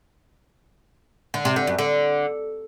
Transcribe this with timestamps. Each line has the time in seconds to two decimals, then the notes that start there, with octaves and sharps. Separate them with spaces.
1.34 D3
1.45 C3
1.56 D3
1.67 F#2
1.79 D3